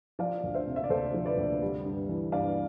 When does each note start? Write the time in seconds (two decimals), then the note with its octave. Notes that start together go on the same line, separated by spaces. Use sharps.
0.19 F3 D5 F5
0.44 D2
0.54 C5 E5
0.67 C3
0.76 E5
0.84 D5
0.90 D2 A4 C5
1.14 F3
1.26 B4 D5
1.38 D2
1.62 G3
1.85 G2
2.09 E3
2.32 G2 D5 F5